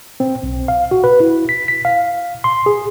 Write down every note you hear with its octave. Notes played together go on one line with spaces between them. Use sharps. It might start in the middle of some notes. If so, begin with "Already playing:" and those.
C4
B1
F5
F#4
B4
E4
B6
B6
F5
C6
G#4